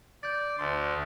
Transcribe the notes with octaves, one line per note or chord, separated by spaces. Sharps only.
D5 G6 A6
D2 C6